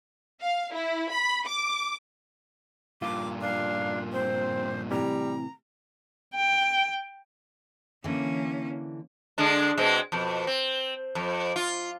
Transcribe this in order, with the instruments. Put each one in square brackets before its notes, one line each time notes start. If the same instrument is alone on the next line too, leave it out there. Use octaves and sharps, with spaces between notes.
[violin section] F5
E4
B5
D6
[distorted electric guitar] G2 A#2 [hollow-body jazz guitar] F4 [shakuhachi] D6
[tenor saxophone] D4 [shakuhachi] F5
[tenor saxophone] C4 [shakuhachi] C5
[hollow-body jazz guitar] A2 C3 E3 [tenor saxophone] G3 [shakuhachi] A#5
[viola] G5
[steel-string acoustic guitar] D3 E3 [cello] A#3 C#4
[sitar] D3 G#3 D4
B2 G#3 C4
F2 B2
C4
F2
F4